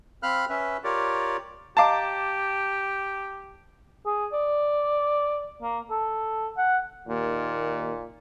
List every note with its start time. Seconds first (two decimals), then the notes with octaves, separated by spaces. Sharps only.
0.23 C4 F5 B5 F6 F#6
0.49 C#4 B4 E5
0.84 F4 G4 A#4 C#5 D5
1.77 G4 D#5 F5 A5 A#5 D6
4.06 G#4
4.33 D5
5.62 A#3
5.91 A4
6.58 F#5
7.08 D#2 A#2 D#3